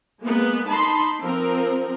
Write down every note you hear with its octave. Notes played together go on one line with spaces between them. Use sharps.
G#3 A#3 B3
D#4 A5 B5 C6
F3 C4 A#4